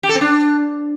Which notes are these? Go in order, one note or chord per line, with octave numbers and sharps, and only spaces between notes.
G4
A4
C4
D4